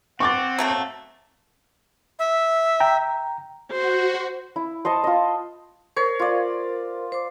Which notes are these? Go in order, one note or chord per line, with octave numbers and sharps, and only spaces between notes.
C4 F#5 C#6 D6 A6
F#3 A3 A#3
E5
G5 A#5
F#4 C5
E4
C5 D#5 A5 C#6
F4 D#5
A#4 C5 C#5
F4 D5
C5 D6